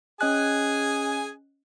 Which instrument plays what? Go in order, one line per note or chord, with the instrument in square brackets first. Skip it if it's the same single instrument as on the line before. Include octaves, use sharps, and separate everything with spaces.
[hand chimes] C#4 D#5 F#6 [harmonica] G#4 G#5